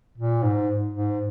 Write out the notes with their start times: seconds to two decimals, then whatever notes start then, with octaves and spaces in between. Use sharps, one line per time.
0.18 A#2
0.42 G#2
0.93 G#2